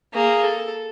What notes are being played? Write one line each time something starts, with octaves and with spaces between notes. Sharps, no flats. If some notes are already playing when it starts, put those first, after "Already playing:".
A#3 G#4
A4